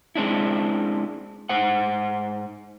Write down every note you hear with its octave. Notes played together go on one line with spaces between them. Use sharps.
G#3 C4 D4 E4
G#2 C5 F#5